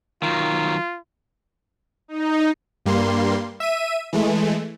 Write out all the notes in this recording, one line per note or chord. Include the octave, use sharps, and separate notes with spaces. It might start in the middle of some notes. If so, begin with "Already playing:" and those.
D#3 F#3 F4
D#4
G2 G3 A#3 C6
E5 D#7
E3 G#3 A3